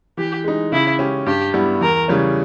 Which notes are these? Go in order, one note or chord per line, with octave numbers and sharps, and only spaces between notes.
E3 G4
G#3 D#4
C#3 E4
G#3 C#4 G4
G2 G4
G3 B3 E4
E2 A#4
C#3 E3 G3 C#4